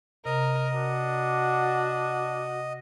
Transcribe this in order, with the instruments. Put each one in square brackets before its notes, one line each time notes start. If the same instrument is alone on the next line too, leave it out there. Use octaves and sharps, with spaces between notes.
[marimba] C3 [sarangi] A#4 [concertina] D#5
[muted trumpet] D4 [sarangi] F#4